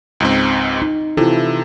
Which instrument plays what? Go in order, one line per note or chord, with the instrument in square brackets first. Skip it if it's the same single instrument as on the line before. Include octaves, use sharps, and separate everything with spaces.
[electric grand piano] C#2 G#2 C4
[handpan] D#4
[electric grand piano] C3 E3 [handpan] E4 F4 A4